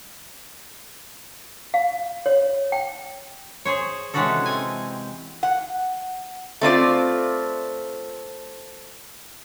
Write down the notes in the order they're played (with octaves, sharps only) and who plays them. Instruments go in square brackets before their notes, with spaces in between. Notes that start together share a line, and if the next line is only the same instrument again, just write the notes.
[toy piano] F5
C#5
G5
[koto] G#4 C5 C#5
C3 E3 G#3 C#4 F#4 A4
C4 G#5
[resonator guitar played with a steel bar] F#5
A3 C4 F4 D5